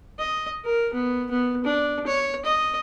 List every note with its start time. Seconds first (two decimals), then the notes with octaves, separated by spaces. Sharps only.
0.19 D#5
0.65 A#4
0.93 B3
1.31 B3
1.64 D4
2.07 C#5
2.45 D#5